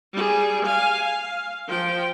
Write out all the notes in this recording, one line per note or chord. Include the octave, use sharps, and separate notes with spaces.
G3 G#4
F5 G#5
F5
F3 G5